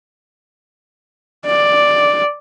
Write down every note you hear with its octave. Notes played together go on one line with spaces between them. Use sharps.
D5